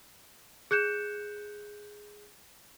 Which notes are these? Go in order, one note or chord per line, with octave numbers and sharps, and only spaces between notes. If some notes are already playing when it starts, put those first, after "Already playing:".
G#4 F#6 G6 C#7 E7